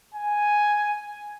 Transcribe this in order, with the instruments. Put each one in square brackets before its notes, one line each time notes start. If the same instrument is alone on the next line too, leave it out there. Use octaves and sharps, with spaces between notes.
[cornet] G#5